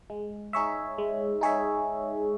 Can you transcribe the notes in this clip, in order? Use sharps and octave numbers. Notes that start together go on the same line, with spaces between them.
G#3
D#4 G#4 C#5 E5
G#3
D#4 G#4 C#5 E5